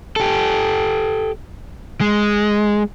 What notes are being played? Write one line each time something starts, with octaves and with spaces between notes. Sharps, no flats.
G4 A4
G#3